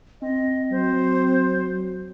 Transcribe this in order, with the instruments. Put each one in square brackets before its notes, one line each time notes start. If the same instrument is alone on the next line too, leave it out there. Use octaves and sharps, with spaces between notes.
[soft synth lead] C4 [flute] D#5
[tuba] F#3 [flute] C5